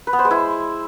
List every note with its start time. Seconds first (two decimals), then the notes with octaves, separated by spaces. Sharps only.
0.07 B4
0.13 B3
0.19 C5
0.25 G#3
0.31 E4